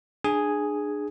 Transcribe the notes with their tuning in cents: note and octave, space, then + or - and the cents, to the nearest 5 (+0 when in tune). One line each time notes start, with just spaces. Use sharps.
D4 +25 G#4 +0 G#5 +0